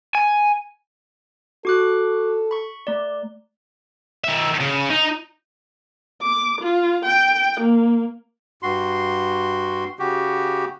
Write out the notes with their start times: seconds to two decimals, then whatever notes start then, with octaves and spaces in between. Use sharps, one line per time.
0.15 G#5
1.65 F#4 A4 D6 F#6
2.51 B5 C#6
2.87 A3 D5
4.24 D#3 E5
4.61 C#3
4.91 D#4
6.22 D6
6.61 F4
7.05 G5
7.60 A#3
8.63 G2 F#4 C6
9.99 C#3 F#4 G4